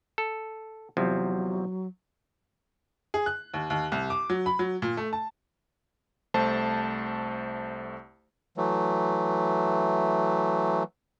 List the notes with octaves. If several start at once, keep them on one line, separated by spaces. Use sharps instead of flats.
A4
E2 C3 F3 F#3
G#4
F#6
D#2
D#2
C2
D6
F#3
B5
F#3
A#2
A3
A5
C2 A3 C5 A5
E3 F#3 A3